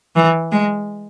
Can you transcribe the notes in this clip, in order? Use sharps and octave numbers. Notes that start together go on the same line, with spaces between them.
E3
G#3